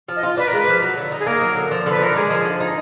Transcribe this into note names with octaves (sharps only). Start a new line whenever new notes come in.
F3
D#5
F4
D4 B4
A#4
G#3
B4
F3
F#3
D3
D#4
G#4
A#3 A#4
F#3
D3
F3
D3 B4
D#4 A#4
G#3 G#4
F3
D3
D#4